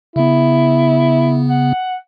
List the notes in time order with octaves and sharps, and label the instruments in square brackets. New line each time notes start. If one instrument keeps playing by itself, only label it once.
[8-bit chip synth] C#3 B3 [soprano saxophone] E4
[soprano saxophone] F#5